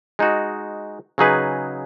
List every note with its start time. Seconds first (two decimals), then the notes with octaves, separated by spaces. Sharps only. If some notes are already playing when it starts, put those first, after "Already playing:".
0.19 G#3 D#4 F#4
1.18 C#3 F#3 D#4 G#4 B4